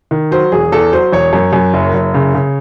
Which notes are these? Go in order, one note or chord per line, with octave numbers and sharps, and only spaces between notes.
D#3
F#3 C5
E1 G#4
E2 A4
F#3 C5
E1 C#5
F#2
F#2
F#1
F#1
C#3
C#3